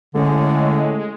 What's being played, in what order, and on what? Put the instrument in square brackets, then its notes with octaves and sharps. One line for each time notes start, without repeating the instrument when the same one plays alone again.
[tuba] A2 [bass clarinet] D3 [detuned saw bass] G#3 [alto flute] C#4